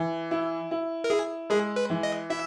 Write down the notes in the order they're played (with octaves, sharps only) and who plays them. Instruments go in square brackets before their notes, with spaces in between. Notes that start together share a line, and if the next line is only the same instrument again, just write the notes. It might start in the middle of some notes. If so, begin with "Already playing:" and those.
Already playing: [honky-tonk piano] E3
E4
E4
[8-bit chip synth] A#4
[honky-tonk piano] E4 [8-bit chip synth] G#4
[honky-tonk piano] G#3 [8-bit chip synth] G#4
[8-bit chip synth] B4
[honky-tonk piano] E3
[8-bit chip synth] D#5
[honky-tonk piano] E4 [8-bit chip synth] E5